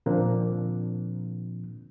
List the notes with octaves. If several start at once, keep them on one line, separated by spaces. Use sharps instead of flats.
A#2 D3 F3 A#3 C4 D4